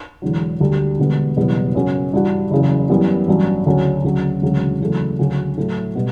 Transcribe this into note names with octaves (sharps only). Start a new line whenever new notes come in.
E1 E2 D3 F#3
D2 D3 G3 D4 G4
E1 D2 D3 G3 B3
F#1 E2 B2 G3 B3
F#2 C#3 F#3 C#4 F#4
G2 E3 G3 D4 F#4
F#1 E2 C#3 F#3
F#2 E3 G3 B3
A1 G2 F#3 C#4 F#4
D2 C#3 F#3 C#4 F#4
D2 C#3 F#3
E1 D2 C#3 F#3
E2 C#3 F#3 A3
D2 C#3 F#3 C#4 F#4
A2 F#3 A3 E4
B2 G3 B3